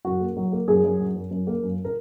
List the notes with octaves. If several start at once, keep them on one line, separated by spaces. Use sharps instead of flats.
F#2 F#4
A#3
F#3
A#3
F#2 G#4
F#2
F#3
F#2
F#2
A#3
F#2
A#4